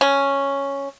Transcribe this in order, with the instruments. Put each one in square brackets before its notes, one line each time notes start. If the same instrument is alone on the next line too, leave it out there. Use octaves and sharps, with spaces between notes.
[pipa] C#4